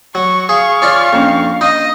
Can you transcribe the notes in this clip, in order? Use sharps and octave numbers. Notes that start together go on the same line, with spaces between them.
F#3 C#6
G#4 F5 C#6
C#4 F4 D5
F2 A#3 C#4 D4
D#4 D#5